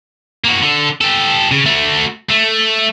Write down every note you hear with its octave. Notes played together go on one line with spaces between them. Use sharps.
A#3 F#4
D3 A4
G4 A4
C#3
A3 F#4
A3